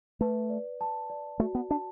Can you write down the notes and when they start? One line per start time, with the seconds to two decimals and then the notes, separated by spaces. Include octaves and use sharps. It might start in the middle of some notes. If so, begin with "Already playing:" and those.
0.21 A3 B4
0.50 D5
0.81 A5
1.10 D5
1.40 A3 F#4
1.55 B3
1.70 D4 A5